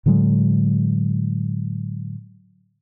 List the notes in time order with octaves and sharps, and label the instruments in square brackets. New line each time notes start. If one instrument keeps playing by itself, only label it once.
[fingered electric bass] A2 D3 F#3 G#3